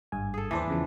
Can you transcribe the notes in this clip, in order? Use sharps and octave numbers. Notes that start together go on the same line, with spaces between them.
G#1 G2 G#5
G#4 A4
D#2 E3 D4 C5
E2 C#3 F3